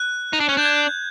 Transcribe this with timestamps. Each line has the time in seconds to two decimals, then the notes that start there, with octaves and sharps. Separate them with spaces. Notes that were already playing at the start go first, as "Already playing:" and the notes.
Already playing: F#6
0.33 D#4
0.40 D4
0.49 C#4
0.57 D4 G6
0.65 G#6